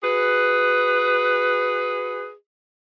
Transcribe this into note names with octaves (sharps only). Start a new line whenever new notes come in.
F#4 G#4 B4